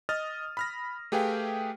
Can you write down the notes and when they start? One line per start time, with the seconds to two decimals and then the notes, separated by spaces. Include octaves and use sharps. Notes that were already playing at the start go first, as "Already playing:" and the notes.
0.09 D#5 D#6 F6 A6
0.57 B5 F6 A#6
1.12 A3 G4 G#4 B4 F5 G5